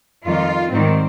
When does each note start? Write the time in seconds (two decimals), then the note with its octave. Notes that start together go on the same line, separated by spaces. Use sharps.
0.25 F2 D#3 G3 F4
0.71 G#2 D#3 G3 C4